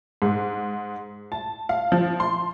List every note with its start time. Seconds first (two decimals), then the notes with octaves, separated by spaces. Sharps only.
0.22 G#2
1.32 A5
1.69 F5
1.92 F3
2.20 C6